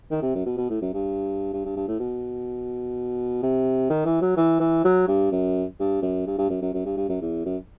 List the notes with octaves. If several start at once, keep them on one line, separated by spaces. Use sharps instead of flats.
D#3
C3
F#2
B2
B2
A2
F#2
G2
G2
G2
G2
A2
B2
C3
D#3
E3
F#3
E3
E3
F#3
G2
F#2
G2
F#2
G2
G2
F#2
F#2
F#2
G2
G2
F#2
E2
F#2